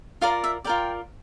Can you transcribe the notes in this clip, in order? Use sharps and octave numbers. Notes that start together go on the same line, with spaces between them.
F4 A#4 D5 F5
E5
F4 A#4 D5 G5